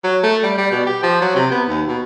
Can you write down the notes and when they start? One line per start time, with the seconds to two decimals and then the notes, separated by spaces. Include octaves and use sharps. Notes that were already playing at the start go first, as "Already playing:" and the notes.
0.04 F#3
0.23 A3
0.43 G3
0.58 G3
0.71 B2
0.86 G4
1.03 F3
1.21 F#3
1.35 C3
1.51 B3
1.68 D#2
1.88 B2